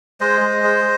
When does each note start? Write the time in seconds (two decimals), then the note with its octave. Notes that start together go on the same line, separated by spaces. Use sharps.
0.20 G#3 C5 D#5
0.41 G#3
0.63 G#3